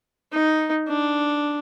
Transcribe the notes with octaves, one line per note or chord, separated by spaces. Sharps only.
D#4
D4